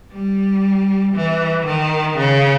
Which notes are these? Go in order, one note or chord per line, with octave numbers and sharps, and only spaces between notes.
G3
E3
D#3
C#3